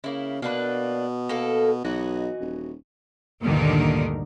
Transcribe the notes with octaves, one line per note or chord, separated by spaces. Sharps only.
C#3 A#3 E4
B2 A#3 D4 B4
A#3 A4
B1 E3 F#4 D#5
D#1
D2 G2 A#2 D3 D#3 A#4